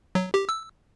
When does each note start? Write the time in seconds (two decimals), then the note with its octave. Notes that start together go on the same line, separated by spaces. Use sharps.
0.15 F#3
0.34 G4
0.49 E6